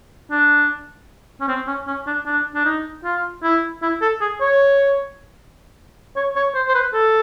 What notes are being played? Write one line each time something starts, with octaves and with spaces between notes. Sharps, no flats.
D4
C#4
C4
C#4
C#4
D4
D4
D4
D#4
F4
E4
E4
A4
G#4
C#5
C#5
C#5
C5
C5
B4
A4